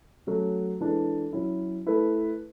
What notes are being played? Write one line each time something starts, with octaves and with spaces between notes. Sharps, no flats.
F#3 A3 C#4 F#4
E3 G#3 D4 A4
F#3 C#4 E4
A3 E4 B4